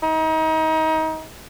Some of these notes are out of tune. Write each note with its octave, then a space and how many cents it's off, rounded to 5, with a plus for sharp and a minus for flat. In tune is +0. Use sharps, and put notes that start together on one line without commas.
D#4 +30